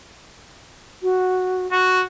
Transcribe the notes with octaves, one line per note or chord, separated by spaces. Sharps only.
F#4
F#4